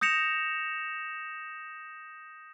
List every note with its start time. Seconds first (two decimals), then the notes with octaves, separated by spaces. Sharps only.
0.01 D#6 G6 A#6 C#7 E7 F7